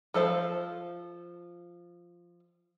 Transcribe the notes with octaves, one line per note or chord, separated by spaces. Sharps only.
F3 A4 C5 F5